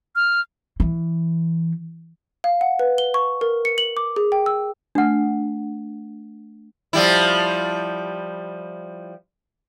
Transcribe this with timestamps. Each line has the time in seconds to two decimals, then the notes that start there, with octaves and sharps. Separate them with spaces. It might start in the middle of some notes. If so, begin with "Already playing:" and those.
0.16 F6
0.80 E3
2.44 F5
2.61 F#5
2.79 B4
2.98 G7
3.14 C#6
3.41 A#4
3.65 C#7
3.78 F#7
3.97 D6
4.16 G#4
4.32 G5
4.46 E6
4.95 A3 D4 F#5 F6
6.93 F3 G3 E4